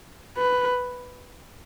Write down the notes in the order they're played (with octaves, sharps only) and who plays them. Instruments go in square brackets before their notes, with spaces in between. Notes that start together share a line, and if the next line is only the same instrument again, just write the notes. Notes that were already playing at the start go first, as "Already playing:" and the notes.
[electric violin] B4